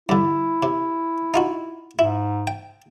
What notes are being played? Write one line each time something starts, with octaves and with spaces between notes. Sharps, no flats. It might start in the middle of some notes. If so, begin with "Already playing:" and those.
G2 D3 E4
C3
D#4 F4 F#4
G#2 E4
G5